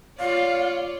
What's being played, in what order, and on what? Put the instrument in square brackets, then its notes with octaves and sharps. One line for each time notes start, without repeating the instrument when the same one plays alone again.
[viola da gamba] F4 C#5 D5 [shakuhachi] F5